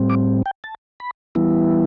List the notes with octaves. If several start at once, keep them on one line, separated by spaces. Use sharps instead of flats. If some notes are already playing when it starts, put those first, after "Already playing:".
Already playing: A2 G3 C4
D6
G5
A5
B5
E3 G3 B3 E4